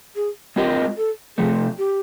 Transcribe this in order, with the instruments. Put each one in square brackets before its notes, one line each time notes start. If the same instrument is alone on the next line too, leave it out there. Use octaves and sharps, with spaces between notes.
[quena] G#4
[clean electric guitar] G#3 C4 F4 A#4 D#5 [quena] G4
[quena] A4
[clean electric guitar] C3 F3 A3 [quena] G#4
[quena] G4